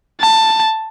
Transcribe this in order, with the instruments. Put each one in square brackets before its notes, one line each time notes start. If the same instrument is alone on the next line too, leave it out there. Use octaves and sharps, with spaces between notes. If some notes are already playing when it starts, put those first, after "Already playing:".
[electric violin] A5